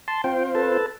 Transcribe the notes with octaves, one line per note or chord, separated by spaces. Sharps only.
A5 C6
C4 F4 C5 G5
A4 B4 A5